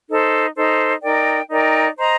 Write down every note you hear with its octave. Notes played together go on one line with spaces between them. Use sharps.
D#4 A4 C5
D#4 A4 C5
D#4 A#4 D5 G5
D#4 A#4 D5 G5
C5 D#5 A#5